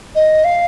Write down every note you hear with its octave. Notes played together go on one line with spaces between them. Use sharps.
D#5
F5